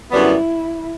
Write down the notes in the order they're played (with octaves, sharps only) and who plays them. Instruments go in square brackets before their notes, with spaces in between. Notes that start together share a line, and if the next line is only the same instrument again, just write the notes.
[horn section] F#2 D3 G3 B3 [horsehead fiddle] E4